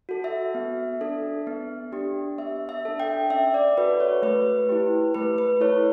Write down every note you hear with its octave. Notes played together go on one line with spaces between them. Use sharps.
F#4 A4
E5
B3
D4 A4
B3
D4 G4
B3 E5
E5
D4 A4
G5
C#4 E5
D5
F#4 A4 B4
C#5
A3 B4
E4 G4
A3 B4
B4
E4 A4 C#5